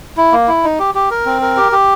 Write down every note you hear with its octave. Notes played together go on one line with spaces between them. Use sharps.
E4
A#3
E4
D#4
G4
G4
A#4
C4
A#4
G4
G4